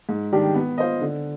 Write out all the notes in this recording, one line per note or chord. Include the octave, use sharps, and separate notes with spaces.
G#2
D#3 G3 D4 G4
B3
F4 C5 D#5
D3